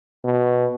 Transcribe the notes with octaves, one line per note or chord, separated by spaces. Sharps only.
B2